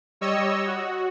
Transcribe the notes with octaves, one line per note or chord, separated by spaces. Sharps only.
G3 C#5 D#5 E6
F#4